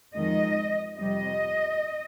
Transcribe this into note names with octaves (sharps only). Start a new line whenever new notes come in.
F2 D#3 G#3 D#5
F2 C3 G3 D#5